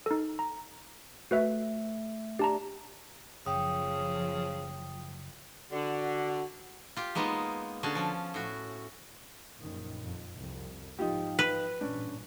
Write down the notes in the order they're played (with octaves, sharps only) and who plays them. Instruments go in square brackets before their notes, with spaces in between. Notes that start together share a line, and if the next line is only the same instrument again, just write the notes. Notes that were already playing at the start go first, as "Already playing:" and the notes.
[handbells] D#4 A4
A#5
[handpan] A3 [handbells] F#4 B4 E5
[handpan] D4 [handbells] G4 A5 A#5
[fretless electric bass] F#1 [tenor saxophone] C#3 [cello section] F3 [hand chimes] G5 D#6
[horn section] D3 [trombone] F#4
[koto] F4 G4
G#3 A#3 B3 D#4 F4
D3 C#4 F#4 G#4 A5
F3 C#4
A2 F#4
[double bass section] A#1 F#2 D#3
F2
C2 F2
[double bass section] G#2 F3 [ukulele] D#4 F4 G4
[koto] B4
[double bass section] A1 G2 A#2 [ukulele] C#4 D4